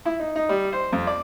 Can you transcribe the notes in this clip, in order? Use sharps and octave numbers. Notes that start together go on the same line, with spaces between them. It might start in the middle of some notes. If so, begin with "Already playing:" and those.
E4
D#4
D#4
G3
C5
F2
D5